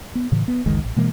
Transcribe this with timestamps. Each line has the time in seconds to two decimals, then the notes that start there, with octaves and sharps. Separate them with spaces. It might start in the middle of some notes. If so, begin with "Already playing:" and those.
0.15 B3
0.32 A2 C#3 E3
0.48 B3
0.66 F#1 C#2 D#3 G#3
0.84 A1
0.96 B2 E3 G#3 A#3